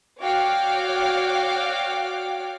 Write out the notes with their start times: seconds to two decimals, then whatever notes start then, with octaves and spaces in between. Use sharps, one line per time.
0.20 F#4 C#5 D5 F5 G5 D6